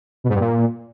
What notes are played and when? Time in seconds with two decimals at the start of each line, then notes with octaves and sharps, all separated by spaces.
0.24 B2
0.29 G#2
0.35 G2
0.40 A#2